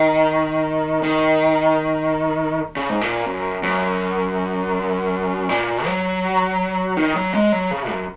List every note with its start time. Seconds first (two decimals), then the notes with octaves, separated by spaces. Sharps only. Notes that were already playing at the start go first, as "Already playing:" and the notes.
Already playing: D#3
1.03 D#3
2.76 C#3
2.89 G#2
3.01 A#2
3.26 F#2
3.63 F#2
5.49 A#2
5.86 F#3
6.97 D#3
7.16 F#3
7.34 G#3
7.52 F#3
7.71 C#3
7.90 F#2